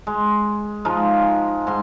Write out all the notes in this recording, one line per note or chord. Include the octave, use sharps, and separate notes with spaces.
G#3
F3 G#3 D#4 F4
G#2 C6